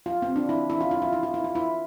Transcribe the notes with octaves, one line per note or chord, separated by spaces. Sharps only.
F4
C4
D4
E4
E4
F4
E4
F4
E4
F4
E4
F4
E4